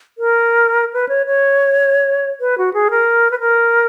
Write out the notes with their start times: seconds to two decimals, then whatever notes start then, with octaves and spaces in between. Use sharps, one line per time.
0.18 A#4
0.93 B4
1.09 C#5
1.26 C#5
2.40 B4
2.58 F#4
2.74 G#4
2.91 A#4
3.31 B4
3.40 A#4